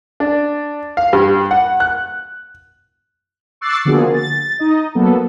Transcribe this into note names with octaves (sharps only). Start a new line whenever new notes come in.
D4
F5
G2
F#5
F#6
C#6 D6 E6 F#6 A6 C7
D3 F3 A#3 B3 F#4 G#4
A6
D#4 D#5
F#3 A#3 B3 A4